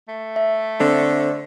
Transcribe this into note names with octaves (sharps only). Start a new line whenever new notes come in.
A3
E5
D3 C4 D4